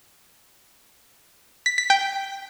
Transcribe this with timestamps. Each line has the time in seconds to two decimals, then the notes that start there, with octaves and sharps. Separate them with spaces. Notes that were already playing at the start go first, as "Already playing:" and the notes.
1.66 B6
1.78 B6
1.90 G5